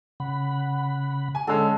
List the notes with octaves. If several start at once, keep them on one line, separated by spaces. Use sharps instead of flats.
C#3 F#5 B5
G#5
D3 G#3 C#4 A4